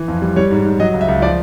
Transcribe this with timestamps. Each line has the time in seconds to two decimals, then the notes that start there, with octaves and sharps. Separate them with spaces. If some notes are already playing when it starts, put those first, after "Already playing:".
Already playing: E3
0.08 F2
0.22 G3
0.36 G3 C#5
0.51 G#2
0.65 G#2
0.80 F#3 D#5
0.94 C#2
1.01 E5
1.08 C#2
1.22 F3 D5